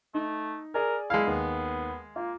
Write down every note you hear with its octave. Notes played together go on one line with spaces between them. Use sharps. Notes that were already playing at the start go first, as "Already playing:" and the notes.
A3 D#4
G#4 A#4 D5 G#5
G#3 E4 F5
D#2 B3
A#3 F4